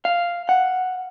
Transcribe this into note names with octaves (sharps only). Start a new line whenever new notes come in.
F5
F#5